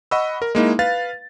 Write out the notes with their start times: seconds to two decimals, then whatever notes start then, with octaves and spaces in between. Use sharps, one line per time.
0.11 D#5 F#5 B5 C#6 E6
0.42 A#4
0.55 G#3 A#3 D#4 E4
0.79 B4 F5 A6